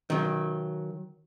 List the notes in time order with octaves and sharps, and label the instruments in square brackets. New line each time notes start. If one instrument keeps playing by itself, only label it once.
[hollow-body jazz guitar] D#3 F#3